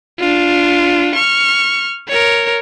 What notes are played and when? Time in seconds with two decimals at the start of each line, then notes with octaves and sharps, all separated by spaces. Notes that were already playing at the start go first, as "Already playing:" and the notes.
0.19 D4 F4
1.15 C#6 F6
2.08 A#4 C#5